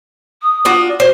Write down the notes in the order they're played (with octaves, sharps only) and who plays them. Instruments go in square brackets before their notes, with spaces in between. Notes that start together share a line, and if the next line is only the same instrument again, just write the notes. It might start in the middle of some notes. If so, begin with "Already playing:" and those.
[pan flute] D#6
[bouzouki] D4 F4 F#4
[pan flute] F#4 [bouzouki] C5